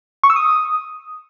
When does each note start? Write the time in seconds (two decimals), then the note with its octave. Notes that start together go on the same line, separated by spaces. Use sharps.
0.24 C#6
0.30 E6
0.36 D#6